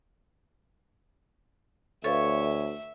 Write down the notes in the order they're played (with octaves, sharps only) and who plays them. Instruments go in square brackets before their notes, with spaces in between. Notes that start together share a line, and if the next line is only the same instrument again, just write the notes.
[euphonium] D2 [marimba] A4 B4 F5 [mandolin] C#5 [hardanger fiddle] E5